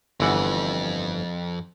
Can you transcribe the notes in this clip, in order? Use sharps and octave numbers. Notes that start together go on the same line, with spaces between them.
G1 F2 E3 F#5